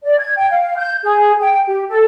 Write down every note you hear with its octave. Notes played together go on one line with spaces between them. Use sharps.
D5
G#6
G5
F5
G6
G#4
G5
G4
A4